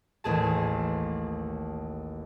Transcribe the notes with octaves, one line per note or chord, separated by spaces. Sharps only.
A1 D#2 G#4 A5